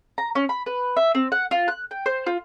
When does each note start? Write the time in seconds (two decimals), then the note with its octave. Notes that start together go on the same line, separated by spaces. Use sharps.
0.18 A#5
0.35 C#4
0.49 B5
0.66 B4
0.97 E5
1.15 C4
1.32 F#5
1.51 F4
1.68 F#6
1.91 G5
2.06 C5
2.26 F4